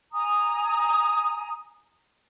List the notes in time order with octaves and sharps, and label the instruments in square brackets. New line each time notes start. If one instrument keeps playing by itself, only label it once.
[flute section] G#5 A#5 D#6